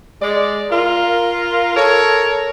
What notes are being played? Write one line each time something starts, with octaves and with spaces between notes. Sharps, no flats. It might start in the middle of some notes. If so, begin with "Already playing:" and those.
G#3 D5
F4 A#4
A4 A#4 C#5